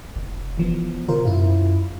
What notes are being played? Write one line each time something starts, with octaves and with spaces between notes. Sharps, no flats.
F1
E3 F3 B3
B2 F4 A#4 C5
F#2 E4 F4